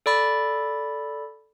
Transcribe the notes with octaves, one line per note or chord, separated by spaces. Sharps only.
A4 D5 B5 A6